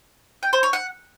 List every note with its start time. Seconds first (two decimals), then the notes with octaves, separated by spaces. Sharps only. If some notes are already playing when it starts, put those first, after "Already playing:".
0.43 G5
0.53 C5
0.63 C#5
0.73 F#5